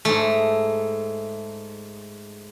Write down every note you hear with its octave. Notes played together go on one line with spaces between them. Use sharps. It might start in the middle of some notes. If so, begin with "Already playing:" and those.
G#2 A3